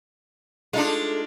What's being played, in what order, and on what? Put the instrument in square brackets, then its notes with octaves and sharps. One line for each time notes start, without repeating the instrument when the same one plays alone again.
[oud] G#3 A3 [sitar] D4 D#4 F4